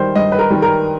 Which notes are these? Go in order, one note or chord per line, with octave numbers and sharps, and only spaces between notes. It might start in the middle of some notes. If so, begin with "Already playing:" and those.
Already playing: D#3 G3 C5
G2 D#5
B4
A#4
D#3 G3
A#4